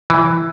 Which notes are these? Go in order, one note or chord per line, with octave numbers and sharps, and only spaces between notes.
E3